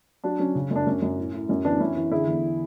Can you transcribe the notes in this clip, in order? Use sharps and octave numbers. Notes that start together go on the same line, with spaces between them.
F#3 D4 F#4
F#3 C#4
C#3
F#2
D4
F#2 C#4
F#2
A2
A2
F#2 C#4
E3 B3 D4
F#2 C#4 E4
E3
D3 E4 G#4
E2